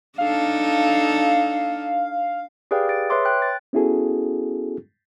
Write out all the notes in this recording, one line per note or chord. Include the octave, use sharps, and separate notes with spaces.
D4 D#4 A4 F5
G4 G#4 B4 D5 F5 G5
G#4 A6 D7
B4 C#5 E5 C6 D6
G5 F#6
A6
B3 C#4 E4 F#4 G#4 A4